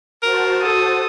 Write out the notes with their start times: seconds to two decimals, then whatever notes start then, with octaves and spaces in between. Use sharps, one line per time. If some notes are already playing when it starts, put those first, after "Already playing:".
0.23 F#4 A#4 C5 A5
0.62 A4 D#6